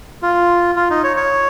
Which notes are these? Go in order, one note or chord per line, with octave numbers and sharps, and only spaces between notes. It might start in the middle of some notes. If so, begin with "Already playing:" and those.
F4
F4
D#4
C#5
C#5